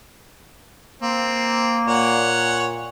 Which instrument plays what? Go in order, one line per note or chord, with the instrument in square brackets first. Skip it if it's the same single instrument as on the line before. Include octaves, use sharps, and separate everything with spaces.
[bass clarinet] A#3 [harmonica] C4
[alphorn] A#2 [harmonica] C#5 F#5